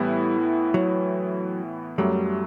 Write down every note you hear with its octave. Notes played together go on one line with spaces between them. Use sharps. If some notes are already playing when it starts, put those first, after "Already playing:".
Already playing: A2 E3 G3 B3 E4
F#3
F#2 F#3 G3 A3